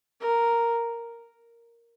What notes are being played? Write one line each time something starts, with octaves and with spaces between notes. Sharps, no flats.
A#4